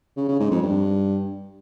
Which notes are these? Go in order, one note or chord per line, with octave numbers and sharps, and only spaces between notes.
C#3
C#3
G#2
F2
G2